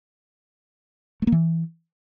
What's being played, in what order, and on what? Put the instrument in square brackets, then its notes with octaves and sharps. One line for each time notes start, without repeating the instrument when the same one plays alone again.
[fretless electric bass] A3
A#3
E3